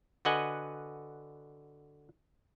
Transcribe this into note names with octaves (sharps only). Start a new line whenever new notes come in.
D3 F#4 B4 D#5 F#5 G#5